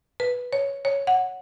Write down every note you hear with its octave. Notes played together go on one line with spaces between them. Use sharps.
B4
C#5
C#5
F#5